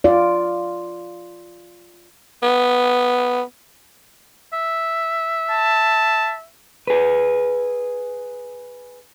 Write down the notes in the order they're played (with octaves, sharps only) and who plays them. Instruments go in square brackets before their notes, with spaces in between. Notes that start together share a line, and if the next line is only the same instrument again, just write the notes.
[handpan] F4 D5
[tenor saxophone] B3
[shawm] E5
[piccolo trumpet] A5
[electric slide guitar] G#4 B4